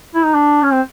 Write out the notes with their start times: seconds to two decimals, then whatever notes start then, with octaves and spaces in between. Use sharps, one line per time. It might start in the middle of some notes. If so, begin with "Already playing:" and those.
0.15 E4
0.25 D#4
0.35 D4
0.63 C#4
0.72 C4